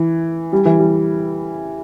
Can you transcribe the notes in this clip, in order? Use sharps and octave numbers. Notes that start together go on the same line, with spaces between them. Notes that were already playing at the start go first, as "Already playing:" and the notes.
Already playing: E3
G3
E3
G3